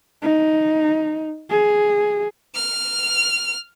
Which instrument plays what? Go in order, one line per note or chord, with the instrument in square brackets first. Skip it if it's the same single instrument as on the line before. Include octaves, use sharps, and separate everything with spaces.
[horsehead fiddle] D#4
G#4
[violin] F6